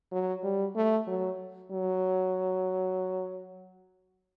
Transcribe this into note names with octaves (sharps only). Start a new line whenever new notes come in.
F#3
G3
A3
F#3
F#3